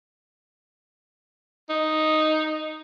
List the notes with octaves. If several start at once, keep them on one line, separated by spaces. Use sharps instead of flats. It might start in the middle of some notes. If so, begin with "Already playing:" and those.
D#4